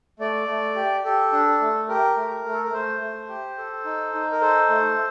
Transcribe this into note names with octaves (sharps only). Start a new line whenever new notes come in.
A3 D5
A3
G4
G4 A4
D4
A3
G4 A#4
A3
A3
A4
A#4
A3 C5
A3
G4
A4
D#4
D#4
A#4
A4 C5
A3